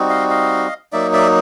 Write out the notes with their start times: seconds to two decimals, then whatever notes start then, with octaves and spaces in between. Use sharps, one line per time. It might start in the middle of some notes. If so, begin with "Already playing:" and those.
Already playing: G3 C4 D#4 F#4
0.09 D#5 F5
0.30 D#5 F5
0.92 F#3 A#3 D#4 D5 E5
1.13 D5 E5